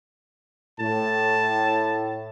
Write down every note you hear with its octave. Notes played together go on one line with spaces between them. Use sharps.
A2 A5